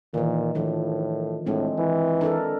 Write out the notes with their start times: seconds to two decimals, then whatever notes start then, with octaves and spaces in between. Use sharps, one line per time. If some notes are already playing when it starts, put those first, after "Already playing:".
0.14 A#2 D#3 E3
0.55 A2 D#3 F3 D4
1.46 A2 G#3 C4 D4
1.78 E3
2.21 D4 A4 A#4